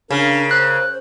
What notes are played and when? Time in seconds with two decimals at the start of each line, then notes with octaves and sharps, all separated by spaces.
0.10 C#3 D4 A#4
0.51 C5 F#6